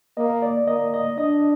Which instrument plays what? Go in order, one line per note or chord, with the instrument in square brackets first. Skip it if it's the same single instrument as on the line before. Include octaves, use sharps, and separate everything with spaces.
[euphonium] A#3 [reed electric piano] D#5
[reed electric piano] D5
[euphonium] A#3 [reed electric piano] D#5
[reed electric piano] D#5
[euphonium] D4 [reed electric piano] D#5